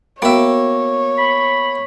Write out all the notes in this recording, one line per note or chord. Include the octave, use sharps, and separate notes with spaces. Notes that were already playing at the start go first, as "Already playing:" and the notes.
A#3 B3 F#4 C#5 E5 G5
B5